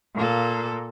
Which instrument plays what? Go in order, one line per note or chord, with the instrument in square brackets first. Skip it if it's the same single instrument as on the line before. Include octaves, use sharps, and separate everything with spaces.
[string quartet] A#2 A#3 A4